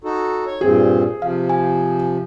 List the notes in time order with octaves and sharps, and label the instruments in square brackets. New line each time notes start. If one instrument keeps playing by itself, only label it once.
[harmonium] D#4 F#4 A4
C#5
[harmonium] G2 A#2 C4 [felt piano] G#4
[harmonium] C3 F3 [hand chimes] F5
[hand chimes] G#5